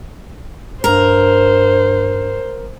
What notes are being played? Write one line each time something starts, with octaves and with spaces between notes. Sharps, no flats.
G2 A#4 C5